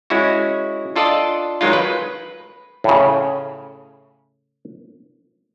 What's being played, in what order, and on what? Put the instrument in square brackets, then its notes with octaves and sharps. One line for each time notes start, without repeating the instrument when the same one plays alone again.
[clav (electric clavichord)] G#3 C#4 E4 F#4
D4 F4 A4 D5 D#5 A5
D#3 F#3 G#3 D#4 F4
B4
A2 C#3